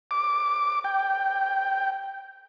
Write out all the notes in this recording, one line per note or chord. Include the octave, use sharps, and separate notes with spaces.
D6
G5